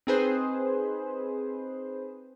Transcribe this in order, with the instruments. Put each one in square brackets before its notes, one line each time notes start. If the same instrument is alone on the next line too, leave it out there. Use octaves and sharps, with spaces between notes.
[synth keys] C4 D#4 G#4 B4 C5